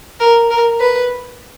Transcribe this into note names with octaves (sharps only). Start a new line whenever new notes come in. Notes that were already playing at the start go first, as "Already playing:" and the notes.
A#4
A#4
B4